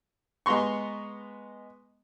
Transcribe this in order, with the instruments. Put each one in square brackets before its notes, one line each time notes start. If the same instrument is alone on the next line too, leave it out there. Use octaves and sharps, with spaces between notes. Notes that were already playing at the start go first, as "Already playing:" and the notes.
[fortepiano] G#3 B3 A#5 C6 C#6